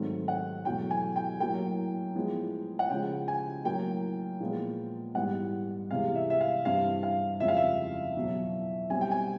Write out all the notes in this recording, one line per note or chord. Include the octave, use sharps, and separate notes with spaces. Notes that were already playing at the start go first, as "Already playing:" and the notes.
Already playing: G#2 D#3 F#3 A3 C4
F#5
E2 B2 F#3 A3 G5
G#5
G5
A2 F#3 A#3 G5
A2 F3 G#3 B3
F#5
C#3 F3 G#3 G5
G#5
A2 F#3 A#3 G5
A#2 F3 G#3 B3
G#2 E3 G3 B3 F#5
E2 C3 E3 G#3 F5
E5
E5
F5
G2 E3 G3 C4 F5
F5
F2 C#3 F3 G#3 E5
F5
E5
E2 B2 F#3
B2 G3 C4 G#5
G5
G#5